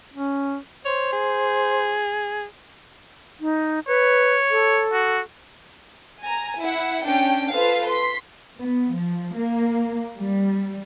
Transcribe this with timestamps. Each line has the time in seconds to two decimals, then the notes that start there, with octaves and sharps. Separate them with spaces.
0.13 C#4
0.85 C5 C#5
1.12 G#4
3.40 D#4
3.87 B4 C#5
4.51 A4
4.92 F#4
6.21 G#5 A#5
6.61 E4 F#5
7.05 C#4 D4 G5
7.52 F4 A4 B4 C5 F5
7.88 C6 B6
8.60 B3
8.94 F3
9.38 A#3
10.19 G3